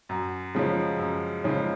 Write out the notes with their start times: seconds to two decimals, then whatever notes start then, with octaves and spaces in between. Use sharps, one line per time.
0.09 F#2
0.55 C#3 F3 G#3 C#4
0.99 F#2
1.44 C#3 F3 G#3 C#4